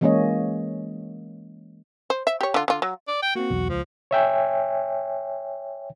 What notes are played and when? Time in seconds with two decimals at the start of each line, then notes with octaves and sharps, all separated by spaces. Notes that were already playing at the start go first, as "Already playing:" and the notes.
0.01 E3 G#3 A#3 C#4 C#5 D#5
2.10 C5
2.27 E5
2.41 G4 C#5
2.54 D3 F4
2.68 D3 F4
2.82 F#3
3.08 D5
3.22 G5
3.35 A#3 C4 F#4
3.50 B1 E2
3.69 C#2 F3
4.11 C#5 E5 G5 G#5